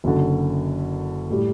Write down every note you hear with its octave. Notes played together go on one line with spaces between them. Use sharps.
F#1 F#2 D3
A2 G3